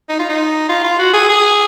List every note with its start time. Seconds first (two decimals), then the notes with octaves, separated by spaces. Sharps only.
0.09 D#4
0.19 F4
0.29 D#4
0.69 F4
0.84 F4
0.99 F#4
1.13 G#4
1.29 G#4